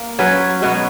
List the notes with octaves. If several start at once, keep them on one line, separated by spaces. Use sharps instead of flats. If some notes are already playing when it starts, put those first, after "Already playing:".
Already playing: A#3
F#3 C#4 F#4 B4
B2 F#3 B3 F#4